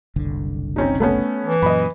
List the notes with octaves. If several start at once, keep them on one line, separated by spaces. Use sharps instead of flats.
F#1 C2 D3
C4 C#4 D#4
A3 B3 C#4
E3
F#2 A#2 D#5 B5